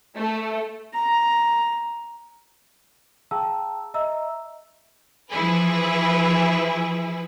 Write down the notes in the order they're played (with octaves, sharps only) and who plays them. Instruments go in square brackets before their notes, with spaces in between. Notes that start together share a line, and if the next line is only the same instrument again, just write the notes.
[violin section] A3
[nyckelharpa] A#5
[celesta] G#4 F5 G5 A5 A#5 E6
D#5 E5 A#5 E6
[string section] E3 F3 E4 G#4 B4